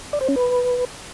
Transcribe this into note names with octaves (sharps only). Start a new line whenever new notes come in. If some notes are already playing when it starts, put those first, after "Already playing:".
D5
C5
C#4
B4